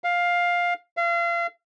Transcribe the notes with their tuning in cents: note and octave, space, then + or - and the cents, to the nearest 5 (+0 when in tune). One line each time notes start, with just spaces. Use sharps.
F5 +10
F5 -35